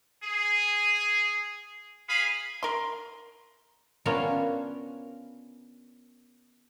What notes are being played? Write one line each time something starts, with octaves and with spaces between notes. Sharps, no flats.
G#4
G#4 F5 B5
A#4 C6
A#3 B3 C#4 D4 F4 A#4